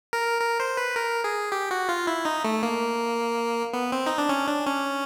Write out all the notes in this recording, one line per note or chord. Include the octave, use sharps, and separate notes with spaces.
A#4
A#4
C5
B4
A#4
G#4
G4
F#4
F4
E4
D#4
A3
A#3
B3
C4
D#4
D4
C#4
D4
C#4